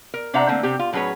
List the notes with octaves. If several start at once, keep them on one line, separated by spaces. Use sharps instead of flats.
A#4
C3 D4 C5 E5 F#5 A#5
D3 A3 A#3 C4
C3 C4 G4
F4
A2 F#3 C#4 G#4 B4 C#5